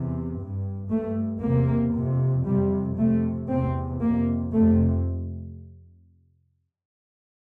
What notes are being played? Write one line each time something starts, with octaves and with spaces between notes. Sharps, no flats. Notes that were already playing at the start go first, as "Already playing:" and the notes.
Already playing: E2 C3
G2
G2 A3
E2 C3 A#3
F2 C3
F2 C3 G3
F2 C3 A3
E2 C3 C4
F2 C3 A#3
F2 C3 A3